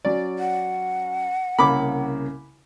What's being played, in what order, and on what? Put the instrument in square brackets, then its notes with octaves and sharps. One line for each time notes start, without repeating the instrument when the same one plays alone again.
[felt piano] F#3 C#4 [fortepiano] D5
[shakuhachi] F#5
[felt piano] C2 C#3 A#3 [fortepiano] B5 D6